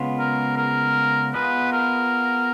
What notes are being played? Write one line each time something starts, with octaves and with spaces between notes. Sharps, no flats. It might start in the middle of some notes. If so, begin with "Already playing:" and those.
Already playing: C#3 G#3 B3 F4
A#4
A#4
B3 F4 G#4 B4 D#5
A#4